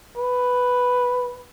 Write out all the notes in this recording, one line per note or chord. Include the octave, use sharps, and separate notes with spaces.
B4